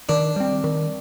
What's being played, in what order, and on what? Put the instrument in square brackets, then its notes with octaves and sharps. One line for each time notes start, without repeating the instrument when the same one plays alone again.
[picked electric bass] D#3 [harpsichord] D4
[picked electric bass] G3 C4
D#3